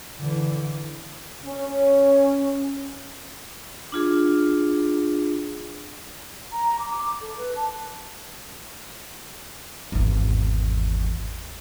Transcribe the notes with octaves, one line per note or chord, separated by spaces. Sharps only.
D3 E3
C#4
D4 F4 G#4
A#5
D6
D6
A4
B4
A5
G#1 E2